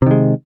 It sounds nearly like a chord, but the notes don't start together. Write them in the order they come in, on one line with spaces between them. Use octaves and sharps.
C3 D#3 G#3